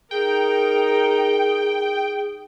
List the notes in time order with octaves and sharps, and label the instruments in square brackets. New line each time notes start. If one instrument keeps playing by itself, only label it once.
[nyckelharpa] D#4 A#4 [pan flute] G#4 [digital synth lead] G5